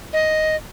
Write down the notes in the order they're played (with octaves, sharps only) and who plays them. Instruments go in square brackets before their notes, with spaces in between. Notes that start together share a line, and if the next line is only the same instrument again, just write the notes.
[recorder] D#5